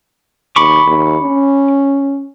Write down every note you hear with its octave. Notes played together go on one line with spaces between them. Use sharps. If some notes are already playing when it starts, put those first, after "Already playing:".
D#2 B5 C#6 D6
D#2
C#4